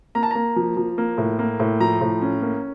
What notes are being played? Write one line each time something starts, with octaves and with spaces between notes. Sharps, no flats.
A#3 A#5
A5
A#3 A#5
F3
F3
A#3
A2
A#3
A2
F3 A#5
A2
C#4
A#3